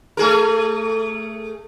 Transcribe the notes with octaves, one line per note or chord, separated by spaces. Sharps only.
A3 G#4 A#4